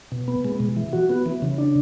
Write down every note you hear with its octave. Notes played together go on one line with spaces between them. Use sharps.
B2
B3
G#3
B2
E3
F#4
B3
E3
C#3
D4